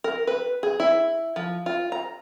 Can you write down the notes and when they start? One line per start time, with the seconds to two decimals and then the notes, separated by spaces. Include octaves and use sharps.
0.04 A#4
0.27 B4
0.63 G#4
0.80 E4
1.36 F3
1.66 F4
1.92 A#5